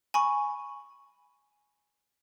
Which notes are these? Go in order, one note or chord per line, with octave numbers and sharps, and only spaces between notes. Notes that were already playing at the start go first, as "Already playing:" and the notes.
G#5 B5 C#6